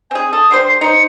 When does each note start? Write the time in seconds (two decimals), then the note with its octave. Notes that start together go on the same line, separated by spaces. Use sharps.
0.11 C4 G#4 G#5
0.33 A4 D#6
0.51 D3 G3 C5 C7
0.64 C7
0.81 D#4 C5 C#7